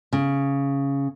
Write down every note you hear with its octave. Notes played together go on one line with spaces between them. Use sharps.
C#3